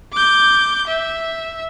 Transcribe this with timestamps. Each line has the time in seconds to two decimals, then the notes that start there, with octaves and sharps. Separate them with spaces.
0.13 D6 G6
0.87 E5